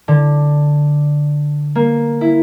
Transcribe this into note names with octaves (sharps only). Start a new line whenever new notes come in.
D3
A#3
E4